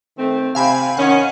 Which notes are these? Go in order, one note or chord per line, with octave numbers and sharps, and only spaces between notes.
D#3 A3 C4
C3 C4 F5 G#5 B5
D#3 C#4 F#5